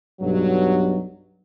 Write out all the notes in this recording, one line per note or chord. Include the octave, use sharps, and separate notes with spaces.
B1 G2 F#3